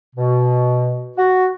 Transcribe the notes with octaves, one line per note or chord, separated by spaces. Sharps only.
B2
F#4